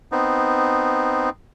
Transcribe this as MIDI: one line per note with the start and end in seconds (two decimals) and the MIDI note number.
0.12 1.30 59
0.12 1.30 60
0.12 1.30 63